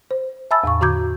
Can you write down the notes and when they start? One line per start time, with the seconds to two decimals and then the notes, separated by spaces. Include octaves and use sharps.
0.11 C5
0.51 E5 G#5 A5 B5 E6 A6
0.64 E2 A2 F5 C#6
0.81 D3 F#4 A#5 D6 G6 G#6